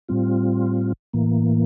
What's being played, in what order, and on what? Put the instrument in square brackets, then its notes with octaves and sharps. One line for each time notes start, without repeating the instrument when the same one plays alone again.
[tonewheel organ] A2 G3 C4 F4
A2 E3 A#3